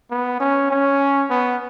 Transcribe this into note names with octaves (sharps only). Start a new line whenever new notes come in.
B3
C#4
C#4
B3